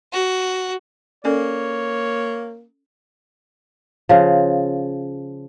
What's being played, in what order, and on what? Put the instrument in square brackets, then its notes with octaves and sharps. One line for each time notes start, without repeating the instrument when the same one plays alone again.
[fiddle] F#4
[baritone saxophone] A#3 [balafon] C#4 A4 D5 [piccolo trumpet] C#5
[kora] C#3 F3